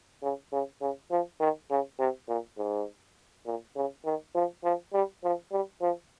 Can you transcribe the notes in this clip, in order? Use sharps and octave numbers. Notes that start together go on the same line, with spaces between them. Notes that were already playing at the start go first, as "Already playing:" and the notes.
C#3
C#3
C#3
F3
D#3
C#3
C3
A#2
G#2
A#2
C#3
D#3
F3
F3
G3
F3
G3
F3